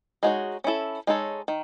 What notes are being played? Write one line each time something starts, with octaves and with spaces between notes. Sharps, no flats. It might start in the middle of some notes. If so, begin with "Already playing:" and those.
G#3 D#4 F#4 C#5
C#4 E4 A4
G#3 D#4 A4 C#5
D#3